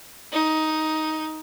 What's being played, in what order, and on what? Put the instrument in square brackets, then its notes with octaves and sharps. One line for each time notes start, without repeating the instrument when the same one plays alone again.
[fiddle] D#4